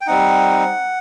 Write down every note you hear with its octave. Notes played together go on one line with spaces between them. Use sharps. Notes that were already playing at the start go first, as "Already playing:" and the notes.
G5
G3 C4 D#4 F#5